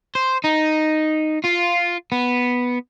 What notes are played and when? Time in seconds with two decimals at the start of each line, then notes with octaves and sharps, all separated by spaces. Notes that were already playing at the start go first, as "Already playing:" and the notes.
0.15 C5
0.44 D#4
1.45 F4
2.12 B3